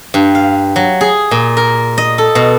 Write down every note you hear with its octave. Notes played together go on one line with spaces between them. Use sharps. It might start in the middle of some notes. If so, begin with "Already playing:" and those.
G2
F5
F#3
G#4
A#2
A#4
D#5
A4
B2